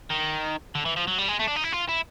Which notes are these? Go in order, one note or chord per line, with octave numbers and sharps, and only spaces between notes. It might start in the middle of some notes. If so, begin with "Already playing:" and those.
D#3
D3
E3
F3
F#3
G3
G#3
A3
D4
D#4
E4
F4
E4